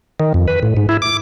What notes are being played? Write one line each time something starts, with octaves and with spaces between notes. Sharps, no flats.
D#3
F2
B4
A2
G#2
E4
D6